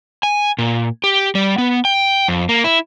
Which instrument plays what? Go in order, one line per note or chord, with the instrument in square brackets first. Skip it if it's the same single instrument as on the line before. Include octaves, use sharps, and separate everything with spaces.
[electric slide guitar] G#5
A#2
G4
G3
B3
G5
F2
A#3
E4